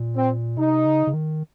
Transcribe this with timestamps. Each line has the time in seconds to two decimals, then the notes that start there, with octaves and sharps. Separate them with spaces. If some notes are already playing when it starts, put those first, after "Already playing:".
Already playing: A#2
0.16 C4
0.57 C3 D#4
0.85 C#3
1.07 C#3
1.14 D#3